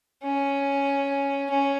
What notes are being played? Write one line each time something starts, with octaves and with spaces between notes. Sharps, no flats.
C#4
C#4